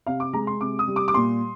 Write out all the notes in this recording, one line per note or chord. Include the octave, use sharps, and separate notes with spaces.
C3 F5
D6
G#3 A#5
C6
C3 D6
D#6
G3
D6
D6
A#2 C6